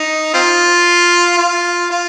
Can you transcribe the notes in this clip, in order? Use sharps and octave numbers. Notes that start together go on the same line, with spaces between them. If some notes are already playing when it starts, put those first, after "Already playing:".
Already playing: D#4
C4 F4
F4
F4